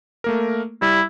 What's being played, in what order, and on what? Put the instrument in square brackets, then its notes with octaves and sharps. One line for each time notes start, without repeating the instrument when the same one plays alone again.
[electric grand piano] A3 A#3 A#4
[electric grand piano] G3 [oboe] E4